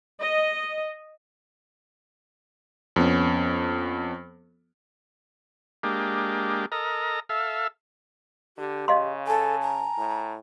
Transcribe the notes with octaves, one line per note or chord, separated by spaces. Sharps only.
D#5
F2 B3 C#4
G#3 A#3 D4 G4
A4 A#4 D#5 A#5
A4 E5 F5
D3 G4
C#3 D#5 F5 C6
A4 G#5 A5
A#5
A2